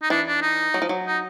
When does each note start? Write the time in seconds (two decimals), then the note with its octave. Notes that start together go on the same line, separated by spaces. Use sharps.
0.02 D#4
0.10 E3 D4
0.27 D4
0.42 D#4
0.74 F#3
0.82 F3
0.89 F#3
1.07 D#4